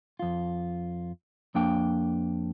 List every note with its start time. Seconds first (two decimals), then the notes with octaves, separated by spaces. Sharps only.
0.19 F2 F4
1.55 F2 A#3 D4 G5